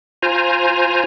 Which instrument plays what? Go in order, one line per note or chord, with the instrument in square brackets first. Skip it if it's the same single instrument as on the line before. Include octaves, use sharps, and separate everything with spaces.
[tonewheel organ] F4 C5 G#5 A#5